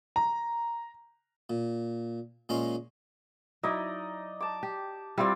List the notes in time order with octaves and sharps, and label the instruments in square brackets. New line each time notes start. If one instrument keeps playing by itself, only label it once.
[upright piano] A#5
[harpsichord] A#2
A#2 G#3 C#4 A#5 C6
[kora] F#3 E4 [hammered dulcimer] D#4 D5 D#5
[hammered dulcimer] A5 D6
[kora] G4
[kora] G3 C4 [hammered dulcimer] E4 F4 D5